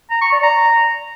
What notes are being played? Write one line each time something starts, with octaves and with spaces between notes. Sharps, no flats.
A#5
C#6
D5
A#5